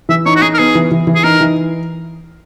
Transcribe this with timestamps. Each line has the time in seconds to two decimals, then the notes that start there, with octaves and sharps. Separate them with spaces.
0.09 E3 E5
0.26 D#4 C#5
0.36 F#4
0.42 D#4 G#4
0.54 A#4
0.58 B3 G#4
0.75 E3
0.91 E3
1.07 E3
1.15 G#4
1.24 D#4 A#4
1.41 E3